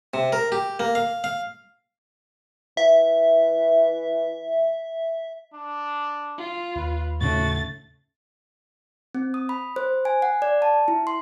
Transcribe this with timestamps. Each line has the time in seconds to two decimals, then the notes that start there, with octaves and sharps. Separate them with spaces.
0.14 C3
0.32 A#4
0.52 G4
0.80 A#3
0.95 F5
1.24 F5
2.77 E3 E5
5.54 D4
6.38 F4
6.76 D#2 B4
7.21 A2 C#3 A3 C#4 F#4 A6
9.15 C4
9.34 D#6
9.49 B5
9.76 C5
10.05 G#5
10.22 F#5
10.42 D5
10.62 A5
10.88 E4
11.07 C6